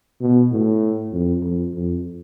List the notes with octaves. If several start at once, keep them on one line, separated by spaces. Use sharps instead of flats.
B2
A2
F2
F2
F2